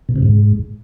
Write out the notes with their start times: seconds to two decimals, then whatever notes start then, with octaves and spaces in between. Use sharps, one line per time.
0.09 B2
0.16 C3
0.23 G#2